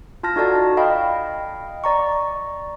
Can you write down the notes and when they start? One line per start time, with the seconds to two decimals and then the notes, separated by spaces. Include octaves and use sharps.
0.23 F4 A5 F6 A#6
0.36 D#4 F#4 A4 D5 A5
0.77 D#5 F5 G5 B5
1.84 D5 A#5 C#6